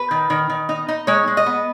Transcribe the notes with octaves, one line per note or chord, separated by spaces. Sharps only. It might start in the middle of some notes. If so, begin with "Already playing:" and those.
Already playing: B4
D#3
D#3
D#3
D#4
D#4
G#3 C#5
G#3
D#5
B3